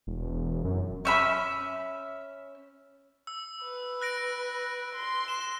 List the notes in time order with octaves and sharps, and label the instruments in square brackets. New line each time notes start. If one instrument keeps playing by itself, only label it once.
[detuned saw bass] E1
F#2
[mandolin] C#4 E5 B5
[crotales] E6
[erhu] B4
[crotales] F#6 A#6 D7
[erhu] C6
[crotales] E7